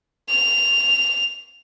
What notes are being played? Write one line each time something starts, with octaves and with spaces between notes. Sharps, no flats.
F7